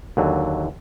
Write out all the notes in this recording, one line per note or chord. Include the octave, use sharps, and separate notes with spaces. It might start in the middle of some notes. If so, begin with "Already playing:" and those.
D#2 D3 F#3